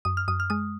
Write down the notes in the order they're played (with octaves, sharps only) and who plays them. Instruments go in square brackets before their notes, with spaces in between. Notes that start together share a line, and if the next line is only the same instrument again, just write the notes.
[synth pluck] F#2 D#6
F6
F#2 D#6
F6
G#3 D#6